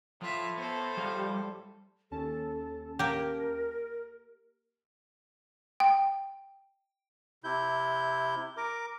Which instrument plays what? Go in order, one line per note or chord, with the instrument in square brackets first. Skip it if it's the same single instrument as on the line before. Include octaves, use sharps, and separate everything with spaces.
[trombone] A2 [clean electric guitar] F3 [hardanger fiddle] F4 E5
[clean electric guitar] B3 [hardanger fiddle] A4 C5
[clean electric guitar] F3 G#4 F5 [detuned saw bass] G3
[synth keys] D#2 C#4 A5 [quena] A4
[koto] A#3 G4 [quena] A#4
[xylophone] G5
[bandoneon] C3 E4 G6
A#4 D6